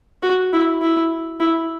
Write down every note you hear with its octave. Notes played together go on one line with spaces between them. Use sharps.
F#4
E4
E4
E4